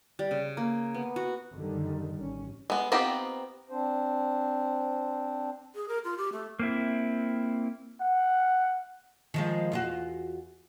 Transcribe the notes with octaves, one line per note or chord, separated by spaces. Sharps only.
G3
C#3
A#3
B3
F#4
F#2 D3 D#3 G3
A1 C#4
G#3 B3
B3 C4 D#4 F4 G4
C4 D4 C5
G#4
A#4
F4
G4
A3
A#3 C4 E4
F#5
D#3 F3 G#3
E2 F4 F#4